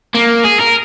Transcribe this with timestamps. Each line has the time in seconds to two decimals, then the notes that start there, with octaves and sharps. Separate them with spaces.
0.14 A#3
0.45 G#4
0.61 A#4